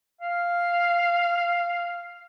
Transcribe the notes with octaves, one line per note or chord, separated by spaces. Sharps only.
F5